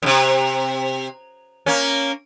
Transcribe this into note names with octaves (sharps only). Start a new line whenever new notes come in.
F#2 C3
A#3 C#4